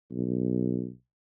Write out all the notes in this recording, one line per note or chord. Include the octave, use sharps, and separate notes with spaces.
B1